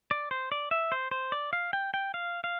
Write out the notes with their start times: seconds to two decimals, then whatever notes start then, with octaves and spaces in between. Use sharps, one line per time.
0.11 D5
0.31 C5
0.52 D5
0.71 E5
0.92 C5
1.11 C5
1.32 D5
1.53 F5
1.73 G5
1.94 G5
2.14 F5
2.44 F5